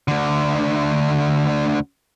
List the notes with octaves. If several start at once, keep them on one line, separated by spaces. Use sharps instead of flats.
D2 D3